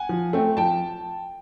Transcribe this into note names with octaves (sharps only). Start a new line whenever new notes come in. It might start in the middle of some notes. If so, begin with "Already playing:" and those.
Already playing: F#5 G#5
F3
A3 C4
F3 G5 A5